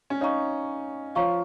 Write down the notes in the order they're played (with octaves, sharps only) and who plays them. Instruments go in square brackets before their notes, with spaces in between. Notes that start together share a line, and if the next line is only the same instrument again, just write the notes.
[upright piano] C#4
[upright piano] D#4 [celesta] C#5 F5 A#5 C#6
[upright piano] F3 F4 [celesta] C#5 F5 A#5 C#6